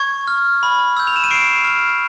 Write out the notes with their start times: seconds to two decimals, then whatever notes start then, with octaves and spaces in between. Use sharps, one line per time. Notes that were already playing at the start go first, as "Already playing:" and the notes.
Already playing: C#6 G#6
0.28 F6
0.63 B5
0.97 E6 G6
1.07 F7
1.16 E7
1.24 D#7
1.30 C#6 C7 D7
1.64 F6